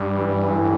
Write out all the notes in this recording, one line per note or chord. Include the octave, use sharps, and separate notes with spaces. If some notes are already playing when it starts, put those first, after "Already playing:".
Already playing: G2 G3
E3
A2